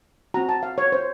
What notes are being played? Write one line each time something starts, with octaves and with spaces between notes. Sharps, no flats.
C4 F#4 A#5
A5
F5
C#5
C5